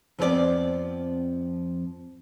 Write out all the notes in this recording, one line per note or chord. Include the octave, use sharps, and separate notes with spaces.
F2 F3 B3 C4 G4 D5